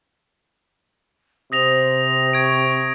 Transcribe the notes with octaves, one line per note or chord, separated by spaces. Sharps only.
C3 C5 D#6 A#6 F7
C#6 G#6 D7